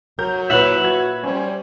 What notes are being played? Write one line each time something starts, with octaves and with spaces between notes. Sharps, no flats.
F#3 A#4 G6 F7
A#2 E4 B4 C#5 E5 F#5
F#4 E6 G#6
G3 C#4 C5